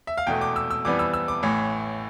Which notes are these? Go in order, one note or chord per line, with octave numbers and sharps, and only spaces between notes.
E5
F5
E2 B2 A3 G5
D6
E6
E6
F2 E3 G3 B3 D6
E6
E6
D6
A1 A2 E3